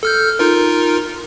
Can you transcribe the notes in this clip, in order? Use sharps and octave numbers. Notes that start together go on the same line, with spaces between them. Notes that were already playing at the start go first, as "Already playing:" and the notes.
A4 F6 G6
D#4 F4 A#4